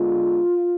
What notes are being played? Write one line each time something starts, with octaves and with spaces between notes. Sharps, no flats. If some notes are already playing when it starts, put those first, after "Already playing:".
Already playing: D3 G#3 B3 D4 F4